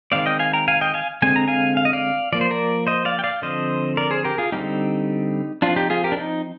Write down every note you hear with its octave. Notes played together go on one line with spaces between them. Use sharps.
D#3 G#3 C4 D5 F5
D#5 G5
F5 G#5
G5 A#5
F5 G#5
D#5 G5
F5 G#5
D3 G#3 C4 G#5
A#5
F5 G#5
F5
D#5
D5 F5
F3 A#3 D5
C5
A#4 D5
C5 D#5
D5 F5
G5
D5 F5
D3 F3 C4 C5 D#5
A#4 D5
G#4 C5
G4 A#4
F4 G#4
D3 G3 C4 D#4 G4
F3 C4 D4 F4
D#4 G4
F4 G#4
G4 A#4
D4
D#4